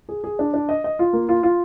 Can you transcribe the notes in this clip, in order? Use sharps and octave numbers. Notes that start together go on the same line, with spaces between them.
G#4
G#4
D4
D4
D#5
D#5
F4
A#3
F4
F4